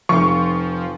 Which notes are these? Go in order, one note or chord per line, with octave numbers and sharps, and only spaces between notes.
F1 F3 C#6